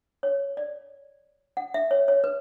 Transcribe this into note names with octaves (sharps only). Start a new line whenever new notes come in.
C#5
D5
F#5
E5
C#5
C#5
B4